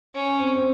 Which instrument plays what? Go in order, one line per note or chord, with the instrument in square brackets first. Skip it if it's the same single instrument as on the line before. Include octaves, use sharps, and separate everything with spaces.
[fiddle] C#4
[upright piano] C4
C4